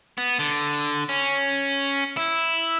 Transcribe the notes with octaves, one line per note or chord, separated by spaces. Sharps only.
B3
D3
C#4
E4